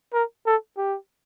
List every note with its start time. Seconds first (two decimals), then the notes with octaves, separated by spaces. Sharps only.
0.14 A#4
0.46 A4
0.77 G4